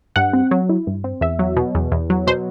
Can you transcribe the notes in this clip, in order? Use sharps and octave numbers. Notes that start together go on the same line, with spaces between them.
G2 F#5
C4
F#3
E4
G2
C4
E2 E5
F#3
B2
E2
E2
F#3
B2 C5